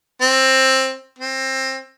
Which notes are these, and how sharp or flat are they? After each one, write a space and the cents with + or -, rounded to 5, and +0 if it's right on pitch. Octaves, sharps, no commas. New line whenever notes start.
C4 +15
C4 +20